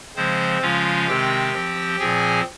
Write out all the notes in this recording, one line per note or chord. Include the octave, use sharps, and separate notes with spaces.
C#3 F3 G#3 C4 C5
C#3 F3 G#3 C#4 F4 F5
C3 D#3 G#3 C4 G4 G5
F3 C4
A#2 F3 C4 G#4 G#5